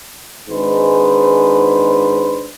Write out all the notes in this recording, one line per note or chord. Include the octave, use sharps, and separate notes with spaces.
G#1 G#2 G#3 D4 B4 C5